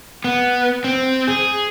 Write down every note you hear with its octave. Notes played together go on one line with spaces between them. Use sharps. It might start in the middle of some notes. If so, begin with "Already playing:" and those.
B3
C4
G#4